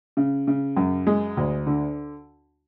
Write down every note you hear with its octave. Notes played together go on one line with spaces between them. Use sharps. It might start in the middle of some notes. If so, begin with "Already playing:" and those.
C#3
C#3
F#2
G#3
D2
D3